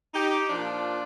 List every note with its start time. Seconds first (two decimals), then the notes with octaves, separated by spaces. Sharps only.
0.14 D#4 G4
0.49 A#2 F3 D4 F4